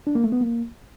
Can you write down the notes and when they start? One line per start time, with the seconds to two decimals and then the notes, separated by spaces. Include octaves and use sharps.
0.07 D4
0.15 A#3
0.24 A3
0.32 B3
0.41 A#3